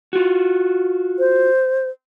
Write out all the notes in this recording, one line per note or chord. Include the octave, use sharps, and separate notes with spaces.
F4 F#4
C5